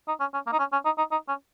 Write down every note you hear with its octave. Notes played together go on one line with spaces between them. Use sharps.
D#4
C#4
C#4
A#3
D#4
C#4
C#4
D#4
D#4
D#4
C#4